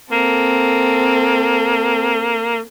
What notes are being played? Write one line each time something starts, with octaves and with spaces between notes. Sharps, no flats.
A#3 C4 A4